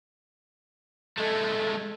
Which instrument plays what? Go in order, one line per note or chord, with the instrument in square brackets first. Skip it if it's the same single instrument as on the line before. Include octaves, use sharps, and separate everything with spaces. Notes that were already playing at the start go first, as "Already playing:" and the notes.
[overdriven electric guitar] G#3 A3 [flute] A4